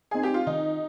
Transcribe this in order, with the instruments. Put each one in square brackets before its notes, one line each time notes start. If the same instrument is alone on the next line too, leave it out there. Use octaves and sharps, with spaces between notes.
[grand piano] C4 D#4 [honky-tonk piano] G#4
[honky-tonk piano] G4
F4
[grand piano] D#3 [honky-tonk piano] D#4